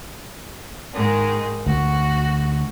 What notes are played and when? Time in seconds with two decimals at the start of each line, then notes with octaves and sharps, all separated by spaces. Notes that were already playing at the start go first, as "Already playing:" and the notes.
0.94 G#2 D#3 G#3
1.66 D2 F#4